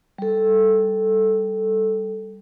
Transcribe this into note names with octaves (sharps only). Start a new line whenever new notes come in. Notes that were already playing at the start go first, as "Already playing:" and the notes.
G3 A4